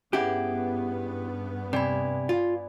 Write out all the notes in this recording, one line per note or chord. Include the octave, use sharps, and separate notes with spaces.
G2 B3 C#4 E4 G4 G#4 F#5
C3 D5 G#5 B5
F4